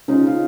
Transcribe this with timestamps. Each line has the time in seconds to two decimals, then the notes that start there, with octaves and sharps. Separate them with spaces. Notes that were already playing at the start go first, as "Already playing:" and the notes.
0.08 C#3 D#4 F4
0.27 F4